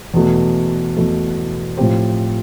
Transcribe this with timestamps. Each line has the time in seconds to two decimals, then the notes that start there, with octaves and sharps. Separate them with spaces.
0.14 E2 B2 A3
0.97 E2 B2 A3
1.77 A2 F3 C4 G4 C5